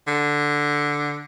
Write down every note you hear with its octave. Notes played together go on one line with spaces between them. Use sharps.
D3